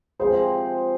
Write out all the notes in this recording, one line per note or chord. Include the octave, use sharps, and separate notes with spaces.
C3 F3 G#3 G#4 C5